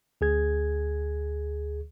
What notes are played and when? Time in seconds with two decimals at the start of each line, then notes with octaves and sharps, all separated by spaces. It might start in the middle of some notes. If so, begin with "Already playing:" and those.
0.21 D2 G#4 G#6